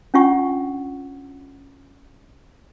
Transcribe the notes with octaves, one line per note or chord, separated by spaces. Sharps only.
C#4 D4 F4 F#5 C#6